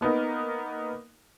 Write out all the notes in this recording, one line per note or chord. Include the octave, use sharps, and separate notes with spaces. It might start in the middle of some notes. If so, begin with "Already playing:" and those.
A#3 B3 D#4 A#4